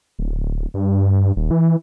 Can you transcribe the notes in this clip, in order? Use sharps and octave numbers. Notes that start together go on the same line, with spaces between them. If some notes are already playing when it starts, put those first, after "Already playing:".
D1
G2
D#1
E3